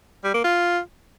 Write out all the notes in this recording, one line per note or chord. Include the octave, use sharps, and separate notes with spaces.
G3
A#3
F4